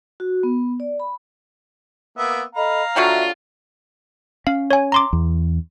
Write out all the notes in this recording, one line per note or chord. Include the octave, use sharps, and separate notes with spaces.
F#4
B3
D5
B5
A#3 B3 E5
A4 D#5 F5 A#5 B5
D3 F#3 G3 F4 F#4 E5
C#4 F5
C#5 G#5
A#5 C6 D6
E2